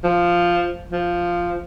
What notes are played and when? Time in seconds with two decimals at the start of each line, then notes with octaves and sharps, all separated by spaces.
0.04 F3
0.92 F3